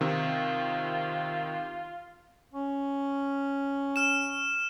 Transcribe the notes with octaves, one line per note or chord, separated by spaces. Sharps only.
C3 D#3 F4
C#4
F6 E7